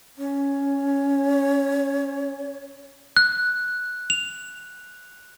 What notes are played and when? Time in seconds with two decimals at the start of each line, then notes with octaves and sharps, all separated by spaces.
0.18 C#4 C#5
3.17 F#6
4.10 F7